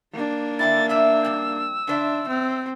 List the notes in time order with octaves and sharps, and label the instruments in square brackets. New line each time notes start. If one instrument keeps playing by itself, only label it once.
[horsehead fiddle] A#3 D4
[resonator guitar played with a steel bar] D3 C4 E4 [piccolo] A6
[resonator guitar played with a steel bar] E2 D5 E5 [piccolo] E6
[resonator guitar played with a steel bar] F2 G3
[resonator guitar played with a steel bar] C#3 C5 E5 [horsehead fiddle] D4
[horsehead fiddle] C4